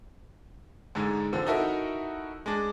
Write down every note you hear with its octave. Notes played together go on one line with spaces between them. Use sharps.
G#2 D3 G#3
D3 F3 C4
D#4 E4 F#4 A4 A#4 E5
G#3 D4